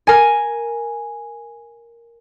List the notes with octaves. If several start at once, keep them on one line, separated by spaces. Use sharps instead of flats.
A#4 G#5